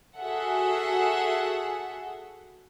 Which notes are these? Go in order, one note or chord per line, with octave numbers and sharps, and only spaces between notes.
F#4 G#4 A4 E5 F#5